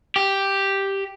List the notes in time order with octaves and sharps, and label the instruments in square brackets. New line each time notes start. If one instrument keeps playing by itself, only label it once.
[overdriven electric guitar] G4